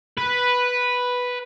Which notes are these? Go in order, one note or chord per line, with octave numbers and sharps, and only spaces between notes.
B4